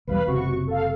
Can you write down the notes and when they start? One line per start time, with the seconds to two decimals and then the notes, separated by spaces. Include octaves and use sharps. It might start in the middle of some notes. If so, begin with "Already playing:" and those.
0.07 B1 E2 G3 B4 F5 B5
0.26 F#1 C#2 C3 F#4 C#6
0.67 A4 F5